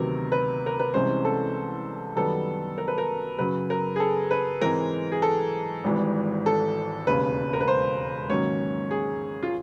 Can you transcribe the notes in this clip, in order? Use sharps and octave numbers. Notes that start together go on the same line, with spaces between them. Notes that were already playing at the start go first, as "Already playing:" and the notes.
Already playing: D2 C3 D#3 F#3 B3 A#4
B4
A#4
B4
C2 C3 E3 G#3 C#4 C5
A4
F#2 D#3 G3 B3 A4
A#4
B4
A#4
F#2 C#3 F#3 B4
A#4
G#4
A4
B4
G#2 E3 G#3 C4 A#4
G#4
A4
G#1 G#2 E3 G3
A4
E1 D#2 C#3 B4
A#4
B4
C5
G#2 D#3 F#3 A#3 C#4 C#5
G#4
F4